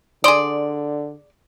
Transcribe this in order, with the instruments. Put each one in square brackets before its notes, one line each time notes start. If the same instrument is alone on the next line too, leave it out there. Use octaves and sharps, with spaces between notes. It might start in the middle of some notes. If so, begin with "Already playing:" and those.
[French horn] D3 [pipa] G#4 D5 [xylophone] C6 D#6